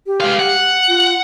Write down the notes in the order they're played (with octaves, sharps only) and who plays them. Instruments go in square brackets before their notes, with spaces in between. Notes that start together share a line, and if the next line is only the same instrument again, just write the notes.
[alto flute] G4
[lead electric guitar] G#3 F5
F#5
[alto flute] F4